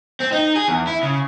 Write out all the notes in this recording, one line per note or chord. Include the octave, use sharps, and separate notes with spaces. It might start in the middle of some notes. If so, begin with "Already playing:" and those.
C4
D#4
G#4
E2
E4
C#3